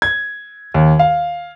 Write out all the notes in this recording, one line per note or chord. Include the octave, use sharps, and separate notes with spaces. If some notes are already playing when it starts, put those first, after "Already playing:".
G#6
D#2
F5